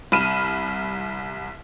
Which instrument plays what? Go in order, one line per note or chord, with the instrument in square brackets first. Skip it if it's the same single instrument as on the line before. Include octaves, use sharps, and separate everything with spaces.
[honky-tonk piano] C2 B5 F6 D#7 E7